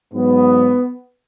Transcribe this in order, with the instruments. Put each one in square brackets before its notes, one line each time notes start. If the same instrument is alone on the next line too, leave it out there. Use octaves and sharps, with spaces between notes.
[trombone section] G#2 F#3 B3